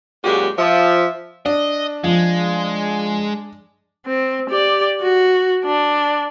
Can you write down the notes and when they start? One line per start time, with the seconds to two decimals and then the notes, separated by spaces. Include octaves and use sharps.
0.23 F#2 A#2 G#3 F#4 G4
0.58 F3 E5
1.46 D4 D#5
2.04 F3 G#3
4.06 C4
4.49 G4 D5
5.01 F#4
5.64 D4